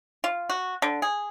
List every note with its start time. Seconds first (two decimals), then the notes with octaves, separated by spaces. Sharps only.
0.24 F4
0.50 F#4
0.82 D3
1.02 G#4